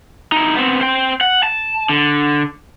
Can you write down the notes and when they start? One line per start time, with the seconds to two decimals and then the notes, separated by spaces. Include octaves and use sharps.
0.32 D#4 E4
0.55 B3 C4
0.81 C5 G5
1.21 F#5
1.43 A5
1.89 D3